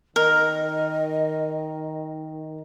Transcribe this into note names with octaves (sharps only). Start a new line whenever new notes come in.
D#3 A#4 D#5